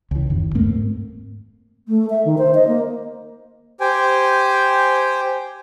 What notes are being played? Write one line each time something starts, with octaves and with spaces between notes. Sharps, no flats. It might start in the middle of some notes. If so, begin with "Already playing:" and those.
C#2 E3
F#1 D#2
G#2 A3 A#3 C4
A3
E5
D#3
C5
D#5
A#3
G4 C5 G5 G#5